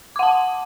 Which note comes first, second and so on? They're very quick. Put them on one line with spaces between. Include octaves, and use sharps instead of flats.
D6 F#5 A5